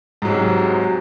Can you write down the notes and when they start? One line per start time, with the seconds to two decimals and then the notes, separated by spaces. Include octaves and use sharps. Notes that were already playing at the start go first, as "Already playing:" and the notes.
0.22 G#2
0.25 F#3
0.28 G#3
0.31 C3